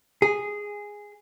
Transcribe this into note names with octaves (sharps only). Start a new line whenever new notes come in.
G#4